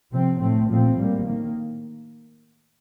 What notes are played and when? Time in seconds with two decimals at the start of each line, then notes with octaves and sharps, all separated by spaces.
0.12 C3 F3 C4
0.40 A2 A3 C4
0.68 A#2 F3 A3 C4
0.96 A2 G3 A#3
1.25 D#3 A#3